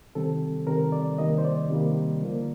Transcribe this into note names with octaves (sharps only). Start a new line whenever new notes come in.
C3 D#3 G3 C4 A4
C3 D#3 G3 C4 A#4
D5
C3 D#3 G3 A#3 D#5
C5
D5
C3 D#3 G3 A#3
D3 F3 A#3